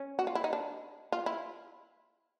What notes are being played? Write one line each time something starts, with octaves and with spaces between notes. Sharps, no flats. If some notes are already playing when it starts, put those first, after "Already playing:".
Already playing: C#4
F#4
F4
E4
D#4
D4
F4
E4